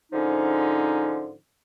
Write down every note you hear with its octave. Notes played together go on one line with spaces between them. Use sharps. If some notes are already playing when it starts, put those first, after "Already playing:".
G#2 D3 F3 C#4 D#4